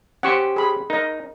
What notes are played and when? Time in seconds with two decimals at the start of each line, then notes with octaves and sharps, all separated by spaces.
0.23 C#4 G4 C5 F#5 C#6
0.56 G#4 B5
0.90 D#4 A#4 D#5